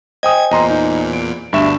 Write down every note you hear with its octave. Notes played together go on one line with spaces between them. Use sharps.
C5 D#5 G5 G#5 D#6 G#6
E2 A#2 D#5 A#5 C6
D#4
D7
G1 D2 G2 D4 E5 C#6 E7